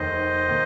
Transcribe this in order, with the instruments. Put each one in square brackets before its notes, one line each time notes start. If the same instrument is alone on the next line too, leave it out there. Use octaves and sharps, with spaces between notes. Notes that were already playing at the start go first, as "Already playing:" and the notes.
Already playing: [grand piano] F1 D#2 D#3 [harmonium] C5 D#5
[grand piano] D#3 A#3